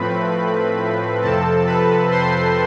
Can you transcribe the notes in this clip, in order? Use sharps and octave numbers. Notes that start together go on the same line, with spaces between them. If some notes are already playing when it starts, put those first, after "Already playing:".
Already playing: A2 F3 A3 C4 B4 B5
F2 C3 F3 C4 A4 A5
B4 B5
C5 C6